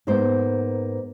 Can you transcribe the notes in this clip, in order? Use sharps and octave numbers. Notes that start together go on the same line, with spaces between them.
G#2 A#3 B3 C5